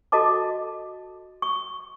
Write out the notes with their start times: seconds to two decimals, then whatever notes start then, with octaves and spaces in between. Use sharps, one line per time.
0.12 F#4 A4 D#5 A5 D6
1.42 C#6